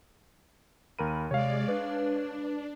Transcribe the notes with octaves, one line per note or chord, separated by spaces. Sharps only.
D#2 A#4 B5 D#7
C3 G#3 C#5 D5 F5
D4 B4